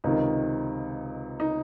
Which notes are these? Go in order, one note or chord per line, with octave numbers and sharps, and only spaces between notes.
C#2 C3 D#3 D#4
D#4